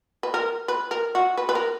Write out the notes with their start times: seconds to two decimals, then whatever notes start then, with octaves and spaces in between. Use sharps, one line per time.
0.23 B4
0.34 A#4
0.68 B4
0.91 A#4
1.15 F#4
1.37 B4
1.49 B4
1.55 A#4